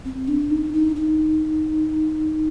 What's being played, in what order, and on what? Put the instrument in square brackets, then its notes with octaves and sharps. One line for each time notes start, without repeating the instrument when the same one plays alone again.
[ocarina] C4
D4
D#4
D#4
D#4